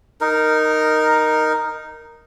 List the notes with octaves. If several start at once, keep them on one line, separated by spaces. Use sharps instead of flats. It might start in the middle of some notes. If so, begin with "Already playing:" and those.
D#4 A#4